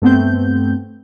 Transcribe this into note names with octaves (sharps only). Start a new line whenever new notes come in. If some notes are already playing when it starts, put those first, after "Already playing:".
G2 A3 B3 C4 G6